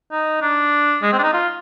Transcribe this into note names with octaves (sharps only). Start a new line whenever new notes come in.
D#4
D4
G#3
C4
D4
D#4
F4